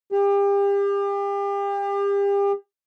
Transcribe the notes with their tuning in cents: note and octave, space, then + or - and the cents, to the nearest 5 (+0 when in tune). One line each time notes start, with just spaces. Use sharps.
G4 +35